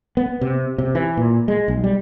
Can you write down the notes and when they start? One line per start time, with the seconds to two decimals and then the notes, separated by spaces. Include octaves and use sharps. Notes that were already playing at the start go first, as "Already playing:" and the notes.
0.17 B3
0.41 C3
0.78 C3
0.95 E3
1.17 A#2
1.48 G#3
1.68 B1
1.84 G3